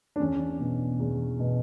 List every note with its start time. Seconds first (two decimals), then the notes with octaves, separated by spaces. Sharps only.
0.16 D4
0.20 E2 C#4
0.60 B2
1.00 E2
1.40 B2